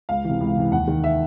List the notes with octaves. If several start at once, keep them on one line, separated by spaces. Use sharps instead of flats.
C#2 F5
C3 E3
C#2
C3 E3
D#2 F#5
D#3
E5